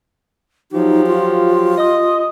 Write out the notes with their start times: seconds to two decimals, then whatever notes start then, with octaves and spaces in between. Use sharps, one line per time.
0.72 F3 F#3 D#4 G4
1.07 F4
1.77 D#5